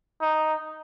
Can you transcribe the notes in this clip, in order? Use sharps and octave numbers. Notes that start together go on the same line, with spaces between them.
D#4